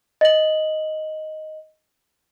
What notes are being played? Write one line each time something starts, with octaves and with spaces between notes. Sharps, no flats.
D#5 F#7